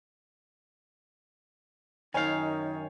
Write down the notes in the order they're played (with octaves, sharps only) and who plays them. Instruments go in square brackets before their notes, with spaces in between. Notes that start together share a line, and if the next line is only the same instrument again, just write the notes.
[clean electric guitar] F#2 D#3 F5 [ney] D#4 [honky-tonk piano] C#5 G#5